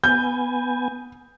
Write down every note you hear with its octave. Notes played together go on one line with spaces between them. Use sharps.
B3 G#5 G6